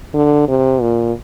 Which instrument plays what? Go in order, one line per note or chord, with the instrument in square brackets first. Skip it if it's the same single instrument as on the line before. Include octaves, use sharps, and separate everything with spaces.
[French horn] D3
C3
A#2